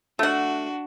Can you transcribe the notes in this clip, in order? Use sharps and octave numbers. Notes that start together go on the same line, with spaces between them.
A3 D4 F#4 F#5